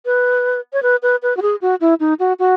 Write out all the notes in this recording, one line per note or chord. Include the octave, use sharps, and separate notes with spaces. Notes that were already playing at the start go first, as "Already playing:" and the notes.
B4
C#5
B4
B4
B4
F#4
G#4
F#4
E4
D#4
F#4
F#4